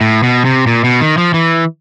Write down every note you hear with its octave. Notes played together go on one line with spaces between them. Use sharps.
A2
B2
C3
A#2
B2
D#3
F3
E3